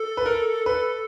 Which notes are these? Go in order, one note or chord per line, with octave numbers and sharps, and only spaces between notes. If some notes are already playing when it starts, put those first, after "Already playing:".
Already playing: A4
B4
A#4
B4